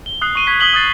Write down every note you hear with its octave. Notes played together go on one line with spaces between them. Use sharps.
G7
D#6 F#6 C7
C#6 D#7 G7
C#6 G#6 B6 D#7
D#6 B6 F#7 G7
D#6 F#6 A6 C7